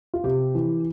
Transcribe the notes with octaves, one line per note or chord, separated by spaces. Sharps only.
F4
C3 G4
E3